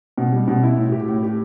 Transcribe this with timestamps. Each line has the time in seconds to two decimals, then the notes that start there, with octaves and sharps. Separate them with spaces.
0.18 B2
0.32 G3
0.48 B2
0.63 E4
0.77 A2
0.92 G4
1.08 A2
1.23 G4